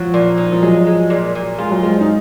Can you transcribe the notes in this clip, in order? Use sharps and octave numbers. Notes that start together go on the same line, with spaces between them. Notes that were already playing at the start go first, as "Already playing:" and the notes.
Already playing: F3 F#3
A#2
D#4
F3
F#3 G#3
G#3
A#2
A#2
G#3 F4
F#3
F3 G#3
D#4